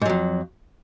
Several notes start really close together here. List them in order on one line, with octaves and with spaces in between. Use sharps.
G#2 F#3 F2